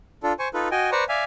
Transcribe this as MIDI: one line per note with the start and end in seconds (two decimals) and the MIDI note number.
0.23 0.33 62
0.23 0.33 65
0.23 0.33 69
0.39 0.48 72
0.39 0.48 80
0.39 0.48 85
0.54 0.68 63
0.54 0.68 65
0.54 0.68 69
0.54 0.68 71
0.71 0.90 66
0.71 0.90 75
0.71 0.90 79
0.71 0.90 80
0.92 1.04 71
0.92 1.04 72
0.92 1.04 74
0.92 1.04 82
0.92 1.04 85
1.09 1.24 74
1.09 1.24 76
1.09 1.24 77
1.09 1.24 80